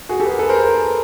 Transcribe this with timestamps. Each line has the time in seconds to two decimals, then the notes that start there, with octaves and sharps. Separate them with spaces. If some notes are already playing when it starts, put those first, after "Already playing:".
0.09 F#4 G#4
0.20 G4 A4
0.26 B4
0.29 G#4 A#4
0.39 A4 B4
0.49 A#4 C5